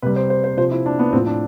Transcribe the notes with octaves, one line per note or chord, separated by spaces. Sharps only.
C3 G3 B4
C5
C5
C5
C3 F3 C5
E4
D4
B3
A2 F3 C4
D4